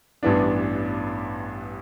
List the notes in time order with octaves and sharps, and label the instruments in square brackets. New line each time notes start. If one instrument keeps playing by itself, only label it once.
[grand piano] A1 G2 E3 B3 D4